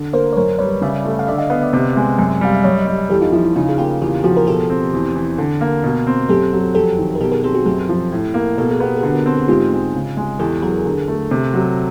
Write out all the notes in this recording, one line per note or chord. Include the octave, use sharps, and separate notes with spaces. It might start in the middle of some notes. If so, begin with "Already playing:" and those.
Already playing: D3
A#3 A#4 C5
C#5
F#2 A#4 C5
G3 B4 C#5
C#3 D5 E5
A3
F5
D3 D5 E5
D#5 F5
B3 D#5 F5
D5 E5
C3
G#3
F#2
G3 F5
E5
F#2 C#5 D#5
G3
E2 G4 A4
D#4 F4
F3 E4
E4
C#3 D#4 F4
G#4
A#3 F4 G4
E2 F4 G4
F3 F#4 G#4
A#4
B2 G4 A4
C4
E2
E3
D3
A#3
B2
C4
F#2 G4 A4
F#3
F2 G4 A4
D#3
A#4
B2 G4 A4
G#4 A#4
C4 G4 A4
F#4 G#4
F#2 G4 A4
F3
A2
A#3
B2 A4
G#4
B3 G4
F#4 G#4
D3
A#4
C4 A4
G#4
G#2 F4 G4
G#3
C#3
G#3
E2 G4 A4
F#3 G#4 A#4
D3
A3
C3
F#3